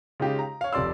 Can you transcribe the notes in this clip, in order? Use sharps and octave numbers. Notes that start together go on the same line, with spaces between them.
C#3 G#3 D#4 F4 G4
A#5
C#5 F5
F1 F2 C3 D5 C6 E6